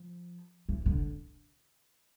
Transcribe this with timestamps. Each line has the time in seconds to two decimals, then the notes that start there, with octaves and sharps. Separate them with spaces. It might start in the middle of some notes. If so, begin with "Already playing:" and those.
Already playing: F3
0.69 E3
0.86 D3